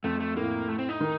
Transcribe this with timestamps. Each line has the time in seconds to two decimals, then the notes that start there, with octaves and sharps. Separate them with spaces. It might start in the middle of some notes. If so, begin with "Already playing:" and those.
0.04 F2 A3
0.20 A3
0.36 A2 A#3
0.69 A3
0.79 C4
0.89 D#4
1.00 D#3